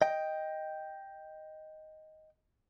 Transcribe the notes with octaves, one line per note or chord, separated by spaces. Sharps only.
D#5 G5